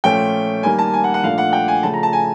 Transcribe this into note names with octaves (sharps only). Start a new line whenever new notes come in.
A#2 F3 A3 C#4 G5
D#3 G3 A#3 G#5
A5
G#5
F#5
F#5
A#2 F3 A3 D4 F5
F#5
G5
G#5
C#3 F3 A3 A5
A#5
A5
G#5